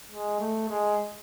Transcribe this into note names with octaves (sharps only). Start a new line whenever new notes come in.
G#3
A3
G#3